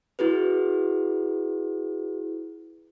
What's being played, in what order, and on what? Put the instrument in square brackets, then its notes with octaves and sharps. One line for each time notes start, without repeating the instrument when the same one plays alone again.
[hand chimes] E4 F#4 G#4 B4